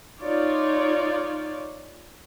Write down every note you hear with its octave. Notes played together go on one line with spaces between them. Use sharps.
D#4 F4 C#5 D5